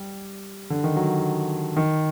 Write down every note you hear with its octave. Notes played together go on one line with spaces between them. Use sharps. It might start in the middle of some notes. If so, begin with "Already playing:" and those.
Already playing: G3
D3
D#3
F#3
D#3